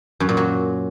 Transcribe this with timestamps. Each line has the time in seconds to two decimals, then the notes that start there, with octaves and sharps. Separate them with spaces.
0.20 F#2
0.29 A#2
0.37 F#3